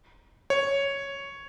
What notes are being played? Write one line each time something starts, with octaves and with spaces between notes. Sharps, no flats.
C#5